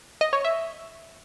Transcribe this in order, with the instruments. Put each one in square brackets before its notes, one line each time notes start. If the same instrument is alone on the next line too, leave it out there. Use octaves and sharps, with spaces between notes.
[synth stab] D#5
C#5
E5